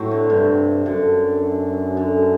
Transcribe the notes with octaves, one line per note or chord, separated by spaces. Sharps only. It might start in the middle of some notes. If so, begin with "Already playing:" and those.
Already playing: A2 F#3 A3 C4
D3
G2 C3
F#2 D3
D3